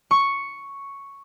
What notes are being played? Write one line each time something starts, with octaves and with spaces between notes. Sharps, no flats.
C#6